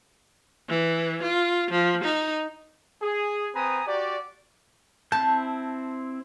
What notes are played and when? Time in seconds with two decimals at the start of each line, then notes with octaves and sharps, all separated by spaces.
0.69 E3
1.22 F4
1.70 F3
2.04 D#4
3.03 G#4
3.56 C4 B4 G#5 A#5 D#6
3.88 F#4 G4 D5
5.12 C4 E4 A5 G6